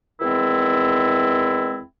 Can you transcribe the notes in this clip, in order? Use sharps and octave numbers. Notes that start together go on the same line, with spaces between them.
E2 D#3 G#3 C4 E4